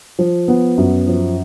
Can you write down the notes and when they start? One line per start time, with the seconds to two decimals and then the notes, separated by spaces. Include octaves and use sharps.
0.19 F3
0.48 B3
0.77 F#2
1.07 F3